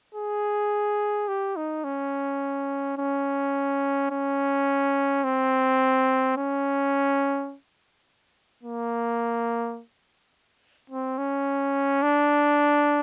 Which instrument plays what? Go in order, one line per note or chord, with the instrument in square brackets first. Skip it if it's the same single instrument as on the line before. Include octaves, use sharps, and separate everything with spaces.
[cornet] G#4
G4
D#4
C#4
C#4
C#4
C4
C#4
A#3
C4
C#4
D4